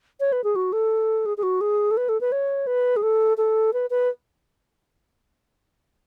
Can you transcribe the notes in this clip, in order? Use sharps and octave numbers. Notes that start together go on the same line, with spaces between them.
C#5
B4
G#4
F#4
A4
G#4
G#4
F#4
G#4
A4
B4
A4
B4
C#5
B4
G#4
A4
A4
B4
B4